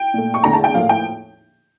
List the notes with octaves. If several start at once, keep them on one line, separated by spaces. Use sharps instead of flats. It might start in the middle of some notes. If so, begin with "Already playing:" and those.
Already playing: G5
A#2 A3
C#6
E2 D3 A3 A#5
A5
G5
A2 F3 A#3 F5
G5